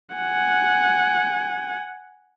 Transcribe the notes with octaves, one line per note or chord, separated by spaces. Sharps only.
F#5 G#5